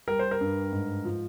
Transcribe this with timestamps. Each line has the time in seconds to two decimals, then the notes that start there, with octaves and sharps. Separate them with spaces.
0.08 G3 A#4
0.19 C5
0.31 A#4
0.41 G2
0.72 G#2
1.05 F3